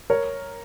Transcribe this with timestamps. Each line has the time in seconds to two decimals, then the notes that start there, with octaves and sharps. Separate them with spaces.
0.10 A#4 C#5